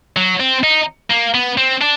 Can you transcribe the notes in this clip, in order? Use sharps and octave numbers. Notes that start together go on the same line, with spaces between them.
F#3
C4
D#4
A#3
B3
C4
D4